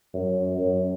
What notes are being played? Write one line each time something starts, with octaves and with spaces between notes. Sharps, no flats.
F#2
F#2